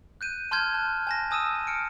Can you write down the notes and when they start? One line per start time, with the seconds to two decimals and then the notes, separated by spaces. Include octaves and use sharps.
0.21 F#6 G6 D#7
0.51 A5 C6 F6 G6 G#6
0.74 A5 F#6
1.07 G#5 A5 A#6
1.31 G#5 D#6 E6 D#7 E7
1.67 F6 C#7 D7